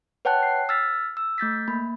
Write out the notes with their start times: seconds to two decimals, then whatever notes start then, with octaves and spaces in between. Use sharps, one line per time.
0.25 B4 C#5 F#5 G5 A5 F#6
0.43 C7
0.69 E6 F6 A6 B6
1.17 E6
1.38 A3 G6 A6 B6
1.68 A#3 B5